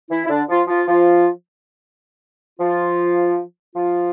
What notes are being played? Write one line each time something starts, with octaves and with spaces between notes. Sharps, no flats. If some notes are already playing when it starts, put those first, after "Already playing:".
E3 E4
E4
D3 D4
F3 F4
F3 F4
F3 F4
F3 F4
F3 F4